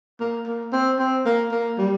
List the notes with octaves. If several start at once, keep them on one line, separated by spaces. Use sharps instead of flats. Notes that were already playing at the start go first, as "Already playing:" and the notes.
A#3
A#3
C4
C4
A#3
A#3
G3